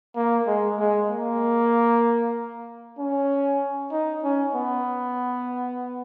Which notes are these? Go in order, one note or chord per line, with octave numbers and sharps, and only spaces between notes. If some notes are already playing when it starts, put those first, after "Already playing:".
A#3
G#3
G#3
A#3
C#4
D#4
C#4
B3